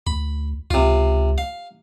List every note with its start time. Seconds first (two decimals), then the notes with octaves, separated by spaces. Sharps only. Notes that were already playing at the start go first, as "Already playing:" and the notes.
0.07 D2 B5
0.71 C#2 C3 F4
1.38 F5